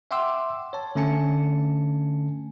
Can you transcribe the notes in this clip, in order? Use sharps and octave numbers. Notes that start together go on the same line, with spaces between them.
E5 F#5 G5 C6 D6 E6
C#5 A5
D3 A3 C#4 G#5 A5 C#7